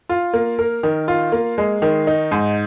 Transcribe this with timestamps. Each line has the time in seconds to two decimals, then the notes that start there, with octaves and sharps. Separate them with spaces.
0.09 F4
0.33 A#3
0.59 A#4
0.83 D#3
1.08 F4
1.32 A#3
1.58 G#3
1.82 D#3
2.07 D#4
2.31 G#2